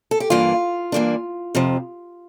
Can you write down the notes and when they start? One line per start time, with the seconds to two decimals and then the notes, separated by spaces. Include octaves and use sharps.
0.11 A4
0.20 G4
0.30 G2 E3 A#3 D4 F4
0.92 G2 E3 A#3 D4
1.55 F2 C3 F3